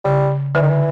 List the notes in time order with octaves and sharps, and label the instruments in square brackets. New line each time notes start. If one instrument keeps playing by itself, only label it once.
[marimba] C#3 [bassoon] G3
[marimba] D3 [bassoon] E3
[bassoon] D#3
E3